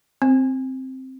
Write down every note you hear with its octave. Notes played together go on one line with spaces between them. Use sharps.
C4